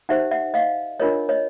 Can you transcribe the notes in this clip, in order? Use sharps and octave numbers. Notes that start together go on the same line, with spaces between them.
D#4 G4 C5 E5 F#5
E5 F#5
D#5 F5
D4 F4 A#4 C#5 D#5
C#5 D#5